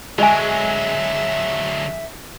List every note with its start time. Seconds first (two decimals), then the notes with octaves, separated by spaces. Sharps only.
0.18 D3 F#3 G#3 D#5 E5 G#5